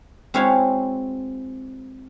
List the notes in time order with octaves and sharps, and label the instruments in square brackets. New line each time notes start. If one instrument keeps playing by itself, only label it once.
[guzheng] G#3 C4 E4 F#4 C#5 F5